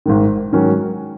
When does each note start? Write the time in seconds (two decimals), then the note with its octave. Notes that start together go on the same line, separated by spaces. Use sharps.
0.06 G#1 G#2 D#3
0.53 G#2 D#3 F#3 C#4 F#4